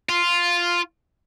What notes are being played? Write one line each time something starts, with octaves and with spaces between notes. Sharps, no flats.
F4